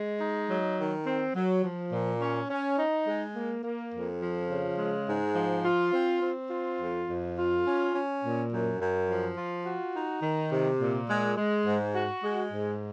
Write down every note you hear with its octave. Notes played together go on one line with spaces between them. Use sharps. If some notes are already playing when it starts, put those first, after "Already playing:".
Already playing: G#3
D#4
F#3
D#3
C4
F#3
F3
A#2
C#4
C#4
D#4
G#3
A#3
A#3
F2
F3
C#3
G#3
G#2
F3
F4
C4
C4
F4
F2
F2
F4
C#4
C#4
A#2
F#2
F#2
F3
F4
F#4
D#4
D#3
C3
A#2
G#3
G#3
G#2
F#4
G#3
G#2